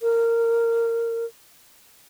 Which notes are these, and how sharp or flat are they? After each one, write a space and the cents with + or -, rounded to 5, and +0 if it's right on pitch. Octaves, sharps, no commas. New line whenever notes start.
A#4 -15